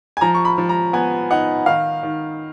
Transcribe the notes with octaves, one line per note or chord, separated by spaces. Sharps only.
G#5
F3 A#5
C#6
B5
F3
A#5
B3 G#5
D#4 F#5
D#3 F5
D#3